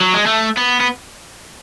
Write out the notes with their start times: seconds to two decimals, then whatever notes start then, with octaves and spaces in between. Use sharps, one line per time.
0.01 F#3
0.14 G#3
0.26 A3
0.57 B3
0.80 B3